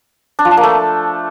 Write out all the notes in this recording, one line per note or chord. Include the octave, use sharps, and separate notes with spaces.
D4
F3
D4
A#3
A3